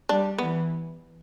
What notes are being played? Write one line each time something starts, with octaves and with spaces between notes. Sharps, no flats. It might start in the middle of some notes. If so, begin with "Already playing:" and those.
G3 D4
E3 B3